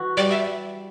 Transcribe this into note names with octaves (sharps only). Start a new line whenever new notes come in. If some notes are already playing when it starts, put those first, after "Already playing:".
Already playing: E3 F#4
G3 D5
E5